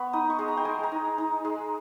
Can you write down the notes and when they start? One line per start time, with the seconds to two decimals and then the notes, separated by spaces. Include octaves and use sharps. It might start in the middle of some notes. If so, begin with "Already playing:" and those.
Already playing: B3 B5 C#6
0.13 D#4 D#6
0.30 C#6
0.39 G#3
0.48 A#5
0.57 G5
0.65 G#3 G#5
0.83 A#5
0.92 D#4
1.18 D#4
1.45 G#3